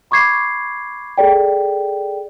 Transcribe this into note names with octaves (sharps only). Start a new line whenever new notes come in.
B5 C#6 D6 G#6 C7
G#4 A4 D5 G5